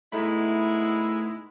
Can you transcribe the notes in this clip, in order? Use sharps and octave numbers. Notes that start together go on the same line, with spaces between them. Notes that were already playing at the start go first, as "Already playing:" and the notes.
G#3 A3 B3 D#4 E4 B5